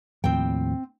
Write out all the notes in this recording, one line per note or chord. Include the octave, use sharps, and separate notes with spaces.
D#2 A2 F3 C4 G5